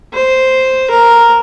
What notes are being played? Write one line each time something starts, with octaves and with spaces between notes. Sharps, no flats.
C5
A#4